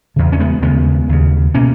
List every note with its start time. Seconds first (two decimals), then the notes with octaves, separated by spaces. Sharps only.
0.16 E2 C#3
0.32 C#4
0.39 G#3 B3
0.63 D#2 C#3 G#3 B3
1.09 D#2 C#3
1.55 B2 A#3 C#4